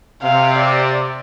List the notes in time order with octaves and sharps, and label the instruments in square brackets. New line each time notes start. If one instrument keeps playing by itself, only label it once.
[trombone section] C3 [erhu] F5
[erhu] D5